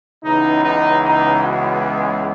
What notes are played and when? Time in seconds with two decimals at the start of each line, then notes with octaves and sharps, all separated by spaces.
0.24 C#2 C#3 E3 G#3 B3 D#4
0.62 D#4
1.01 D#4
1.40 F#4
1.79 G#4